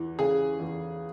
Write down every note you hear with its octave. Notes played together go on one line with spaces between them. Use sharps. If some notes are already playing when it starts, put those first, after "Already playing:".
Already playing: E2 E3
C#3 G#4
E2